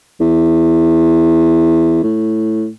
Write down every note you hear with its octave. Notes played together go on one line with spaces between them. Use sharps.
E2
A2